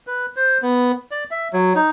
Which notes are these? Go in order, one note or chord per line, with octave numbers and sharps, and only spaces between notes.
B4
C5
B3
D5
E5
F#3
D#4